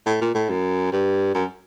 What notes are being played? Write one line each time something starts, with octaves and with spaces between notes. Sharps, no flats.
A2
A#2
A2
F#2
G2
F#2